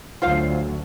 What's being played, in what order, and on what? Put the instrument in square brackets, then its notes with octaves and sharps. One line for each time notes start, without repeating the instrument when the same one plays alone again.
[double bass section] D2 D3 F#3 [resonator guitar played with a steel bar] F4 C5 F5